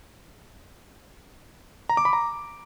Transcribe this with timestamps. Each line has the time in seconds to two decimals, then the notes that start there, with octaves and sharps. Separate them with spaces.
1.89 A#5
1.97 D6
2.05 B5
2.13 A#5